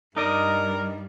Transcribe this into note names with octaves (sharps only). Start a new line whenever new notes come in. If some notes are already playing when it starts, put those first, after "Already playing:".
G2 G3 D#4 A#4 D5 D#5